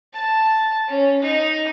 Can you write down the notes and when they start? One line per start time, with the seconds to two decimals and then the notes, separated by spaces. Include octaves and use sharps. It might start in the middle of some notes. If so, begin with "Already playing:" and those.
0.13 A5
0.87 C#4
1.22 D#4